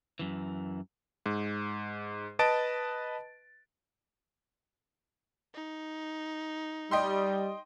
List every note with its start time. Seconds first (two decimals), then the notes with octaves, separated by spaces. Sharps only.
0.19 F#2 E3
1.26 G#2
2.39 B4 D#5 A5 A6 D7
5.54 D#4
6.91 G3 D#5 G5 C6